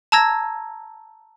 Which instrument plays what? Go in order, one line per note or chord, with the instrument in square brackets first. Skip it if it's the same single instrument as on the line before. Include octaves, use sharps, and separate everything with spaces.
[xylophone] A5 A#5 E6 G#6 A#6